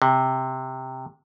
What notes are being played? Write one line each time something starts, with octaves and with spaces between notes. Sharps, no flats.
C3